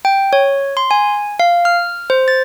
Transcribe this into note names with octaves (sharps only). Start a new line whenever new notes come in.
G5
C#5
C6
G#5
F5
F6
C5
A6